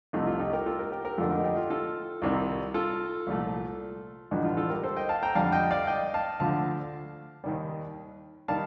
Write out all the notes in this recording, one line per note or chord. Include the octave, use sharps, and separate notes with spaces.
C2 C3 F3 A3 D#4
F4
D#4 G4
G4 A#4
F4 A4
G4 A#4
G4 A#4
G4 A#4
F2 D3 A3 F4 A4
D#4 G4
D#4 G4
F4
F4 A4
C2 C3 D#3 G3
F4 A4
C2 A#2 F3 A3
A1 G2 D3 F3 D#4
F4
F4 A4
G4 A#4
A4 C5
D#5 G5
F5 A5
G5 A#5
F2 D3 G3 F5 A5
D#5 G5
D5 F5
D#5 G5
F5 A5
D2 D3 F3 A3 F5 A5
D#2 D#3 G3
D#3 G3 F5 A5